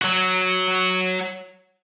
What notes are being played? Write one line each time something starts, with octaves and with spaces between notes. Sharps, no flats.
F#3 F#4